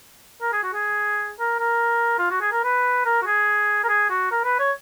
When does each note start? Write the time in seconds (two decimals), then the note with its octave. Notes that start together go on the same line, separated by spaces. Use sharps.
0.41 A#4
0.53 G#4
0.63 F#4
0.74 G#4
1.39 A#4
1.60 A#4
2.19 F4
2.31 F#4
2.41 G#4
2.52 A#4
2.64 B4
3.06 A#4
3.22 F#4
3.26 G#4
3.84 A#4
3.89 G#4
4.10 F#4
4.31 A#4
4.44 B4
4.59 C#5